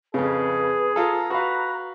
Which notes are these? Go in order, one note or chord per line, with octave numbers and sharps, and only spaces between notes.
F2 C#3 G#4 B4
F4 A4 A#5
F#4 B4 F5